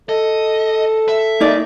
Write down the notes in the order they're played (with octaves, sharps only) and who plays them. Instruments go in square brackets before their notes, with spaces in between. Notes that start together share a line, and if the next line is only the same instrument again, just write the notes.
[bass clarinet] A4 [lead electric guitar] D#5
[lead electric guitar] E5
[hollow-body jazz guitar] A#3 D#4 D5